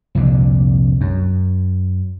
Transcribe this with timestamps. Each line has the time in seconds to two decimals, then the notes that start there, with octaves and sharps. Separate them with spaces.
0.15 C2 F2 A#2 D3
1.01 F#2